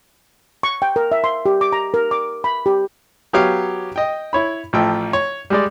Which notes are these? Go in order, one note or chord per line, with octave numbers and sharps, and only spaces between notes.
C#6
G5
A#4
E5
C6
G4
D6
A#5
A#4
D6
B5
G4
F#3 B3 G4 C#5 F5 D6
D#5 G5
E4 C#5 B5
A1 F3 A3 G5
C#5
G3 G#3 D5